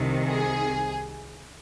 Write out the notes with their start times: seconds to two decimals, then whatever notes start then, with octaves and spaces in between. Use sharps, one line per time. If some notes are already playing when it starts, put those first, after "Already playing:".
Already playing: C2 C3 D#3
0.27 G#4